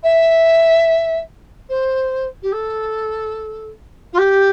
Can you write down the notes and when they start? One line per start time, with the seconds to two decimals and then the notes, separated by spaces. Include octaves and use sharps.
0.03 E5
1.69 C5
2.42 G4
2.52 A4
4.13 F4
4.18 G4